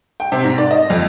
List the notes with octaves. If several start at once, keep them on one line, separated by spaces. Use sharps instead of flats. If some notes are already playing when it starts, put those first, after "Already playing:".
G5
C3
G#2
D5
D#5
F2